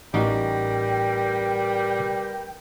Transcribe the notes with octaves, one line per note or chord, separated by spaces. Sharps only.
A1 G3 D#4 F#4 A#4 B4 G5